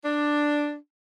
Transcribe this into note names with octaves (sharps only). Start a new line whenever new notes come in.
D4